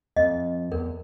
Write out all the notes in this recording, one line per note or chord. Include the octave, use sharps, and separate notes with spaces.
F2 D#5
E2 A#4